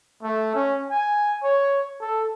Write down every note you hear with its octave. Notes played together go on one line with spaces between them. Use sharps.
A3
C#4
G#5
C#5
A4